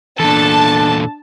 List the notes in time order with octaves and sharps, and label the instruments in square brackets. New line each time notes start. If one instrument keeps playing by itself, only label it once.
[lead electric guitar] E2 A#2 [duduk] D4 [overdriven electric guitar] A4 [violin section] A5